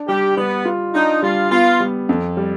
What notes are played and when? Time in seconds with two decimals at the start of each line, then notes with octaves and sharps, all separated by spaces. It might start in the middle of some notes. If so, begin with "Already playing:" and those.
Already playing: D4
0.08 G3 G4
0.37 G3 B3
0.65 F4
0.94 D4 D#4
1.22 G3 F4
1.51 B3 F4
1.80 G3
2.09 F2
2.37 G3